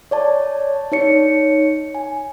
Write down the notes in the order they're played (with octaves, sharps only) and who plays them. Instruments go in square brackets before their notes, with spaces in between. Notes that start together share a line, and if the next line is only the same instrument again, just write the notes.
[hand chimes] C#5 D5 A5
D#4 C#5 C#7
G#5